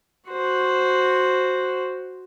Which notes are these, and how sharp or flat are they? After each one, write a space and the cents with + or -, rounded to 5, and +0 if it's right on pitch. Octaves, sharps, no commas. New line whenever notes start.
F#4 +0 C5 +0